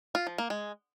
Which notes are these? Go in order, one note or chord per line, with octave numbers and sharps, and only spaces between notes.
F4
F3
A#3
G#3